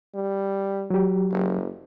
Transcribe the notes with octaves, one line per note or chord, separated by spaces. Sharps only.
G3
F#3 G4
F#1